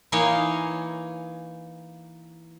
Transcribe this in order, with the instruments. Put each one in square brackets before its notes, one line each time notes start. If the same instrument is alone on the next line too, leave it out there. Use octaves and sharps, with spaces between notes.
[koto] E3 A#3 D#4 C#5 F5 G#5